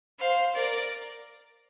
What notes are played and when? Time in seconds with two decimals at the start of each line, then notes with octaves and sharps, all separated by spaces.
0.18 C5 F5
0.55 A#4 D5